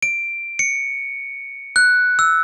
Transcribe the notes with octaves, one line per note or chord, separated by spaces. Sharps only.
D7
C#7
F#6
E6